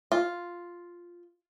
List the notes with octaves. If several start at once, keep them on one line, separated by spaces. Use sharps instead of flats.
F4